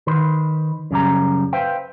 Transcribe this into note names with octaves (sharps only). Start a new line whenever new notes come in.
D#3 B4 C5
F#2 C#3 G3 A#5
B4 C5 E5 F5 G5